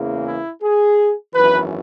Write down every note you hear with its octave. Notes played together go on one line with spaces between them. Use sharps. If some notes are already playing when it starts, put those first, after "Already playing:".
Already playing: E2 C#3 E3 A#3
E4
G#4
G#1 F#2 E3 B4